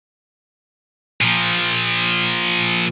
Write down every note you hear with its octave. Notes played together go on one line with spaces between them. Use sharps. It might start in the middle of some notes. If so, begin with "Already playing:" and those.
A#2 F3